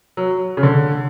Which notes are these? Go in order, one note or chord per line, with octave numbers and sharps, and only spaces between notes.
F#3
C#3
D3